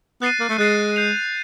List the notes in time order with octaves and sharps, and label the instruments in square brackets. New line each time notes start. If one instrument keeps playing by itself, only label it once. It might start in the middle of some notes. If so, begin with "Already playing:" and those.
[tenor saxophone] B3 [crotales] F#6 A6 C7 D#7
[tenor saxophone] A#3
A3
[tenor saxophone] G#3 [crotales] F#6 A6 C7 D#7
[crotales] G6 C7 F7